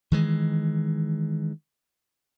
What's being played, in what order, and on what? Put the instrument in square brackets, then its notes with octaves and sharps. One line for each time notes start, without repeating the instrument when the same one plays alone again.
[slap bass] D#3 E3 G#3